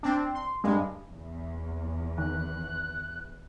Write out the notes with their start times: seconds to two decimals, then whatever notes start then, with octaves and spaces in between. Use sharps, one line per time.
0.03 C4 D4
0.35 C6
0.64 G2 G#3
1.13 E2
2.18 D#3 F#6